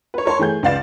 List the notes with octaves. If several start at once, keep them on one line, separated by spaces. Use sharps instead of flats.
B4 C#5
A#4 C#5 A5 C6
E3 A3 G#4 G6
C#2 B4 D5 F5 A6 E7